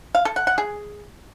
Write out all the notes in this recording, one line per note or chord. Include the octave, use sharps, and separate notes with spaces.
F5
A4
F#5
F#5
G#4